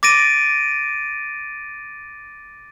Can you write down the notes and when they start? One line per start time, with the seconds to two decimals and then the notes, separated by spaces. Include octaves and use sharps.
0.03 D6 A6 A#6 D7 D#7